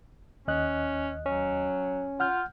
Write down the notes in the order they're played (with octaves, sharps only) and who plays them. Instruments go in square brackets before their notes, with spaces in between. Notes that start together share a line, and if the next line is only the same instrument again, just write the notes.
[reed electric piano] D#2 D#5 F#6 [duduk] C#4
[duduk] F#3 [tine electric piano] C#4
[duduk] F4 [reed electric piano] F#5 F6 G6